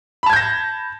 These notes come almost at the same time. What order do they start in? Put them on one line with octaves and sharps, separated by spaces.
B5 A5 G#6 G6 A#6